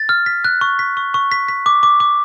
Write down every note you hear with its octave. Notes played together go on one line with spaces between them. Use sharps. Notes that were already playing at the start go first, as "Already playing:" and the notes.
Already playing: A6
F6
B6
F#6
C#6
B6
C#6
C#6
B6
B6
D6
D6
D6